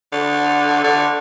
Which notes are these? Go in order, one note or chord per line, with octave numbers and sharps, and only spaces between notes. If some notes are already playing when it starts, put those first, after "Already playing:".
D3
D3